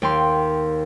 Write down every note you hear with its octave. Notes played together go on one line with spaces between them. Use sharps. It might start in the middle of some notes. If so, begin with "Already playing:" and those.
D#2 G5 C6